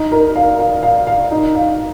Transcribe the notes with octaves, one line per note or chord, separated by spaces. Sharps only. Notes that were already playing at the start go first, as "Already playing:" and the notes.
Already playing: D#4
A#4
F5
F5
F5
F5
D#4
F5